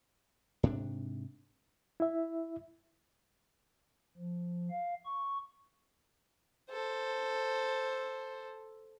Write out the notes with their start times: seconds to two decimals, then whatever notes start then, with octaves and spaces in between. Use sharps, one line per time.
0.63 G#2 C3 D4
2.00 E4 E5
4.17 F3
4.70 F5
5.06 C#6
6.70 A4 C5